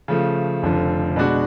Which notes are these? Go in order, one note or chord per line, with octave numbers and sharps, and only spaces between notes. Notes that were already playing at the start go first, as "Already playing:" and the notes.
C#3 F3 A3
F1 F2 D3 F3
B2 G#3 B3 D4 F#4